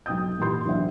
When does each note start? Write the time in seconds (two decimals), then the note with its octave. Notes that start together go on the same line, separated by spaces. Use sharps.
0.06 B1 G5 D#6 G6
0.38 A#2 E3 G4 A#4 C6 G6
0.65 B1 E3 D4 C5 E5 F#5